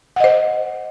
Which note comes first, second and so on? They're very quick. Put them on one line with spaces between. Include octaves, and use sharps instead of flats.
F#5 D#5 C5